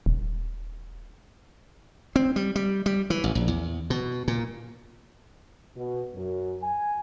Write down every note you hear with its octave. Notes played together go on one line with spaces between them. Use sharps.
D#1
C4
G3
G3
G3
E3
A1
A#1
E2
B2
A#2
B2
F#2
G#5